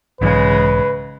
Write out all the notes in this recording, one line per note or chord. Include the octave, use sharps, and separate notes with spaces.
B1 G#2 C#3 E3 G#3 B4